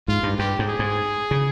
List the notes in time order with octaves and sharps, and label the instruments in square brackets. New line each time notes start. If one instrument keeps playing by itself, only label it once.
[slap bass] G#2 [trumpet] F4
[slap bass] G2
[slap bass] G2 [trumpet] G4
[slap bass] G#2
[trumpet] G#4
[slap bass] G#2
C#3